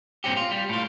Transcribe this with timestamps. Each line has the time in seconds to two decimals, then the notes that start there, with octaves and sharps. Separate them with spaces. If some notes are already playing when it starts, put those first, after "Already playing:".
0.24 G2 A#2 C4 C#4 G4
0.37 F4
0.51 G3
0.69 A2 F4